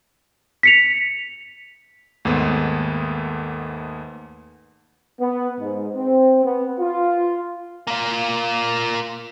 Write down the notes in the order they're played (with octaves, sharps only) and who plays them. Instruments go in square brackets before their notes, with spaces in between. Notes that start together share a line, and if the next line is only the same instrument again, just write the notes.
[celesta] B6 C#7 F7
[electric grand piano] D#2 G#2 A3 B3
[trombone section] B3
G#2
C4
B3
F4
[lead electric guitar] A#3 F4